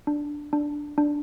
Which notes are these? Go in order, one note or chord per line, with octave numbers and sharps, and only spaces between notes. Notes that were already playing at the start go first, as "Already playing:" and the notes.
D4
D4
D4